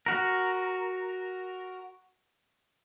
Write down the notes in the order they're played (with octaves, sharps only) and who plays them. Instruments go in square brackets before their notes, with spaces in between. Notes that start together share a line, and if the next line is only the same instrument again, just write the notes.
[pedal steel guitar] F#4 A#4